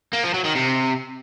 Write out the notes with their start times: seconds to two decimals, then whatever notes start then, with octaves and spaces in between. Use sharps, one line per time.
0.13 A#3
0.23 F3
0.34 F#3
0.44 D#3
0.55 C3